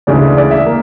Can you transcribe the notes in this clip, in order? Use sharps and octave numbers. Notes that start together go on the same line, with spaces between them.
D2 C#3 E3 G#3 D5
D5
E5
A#3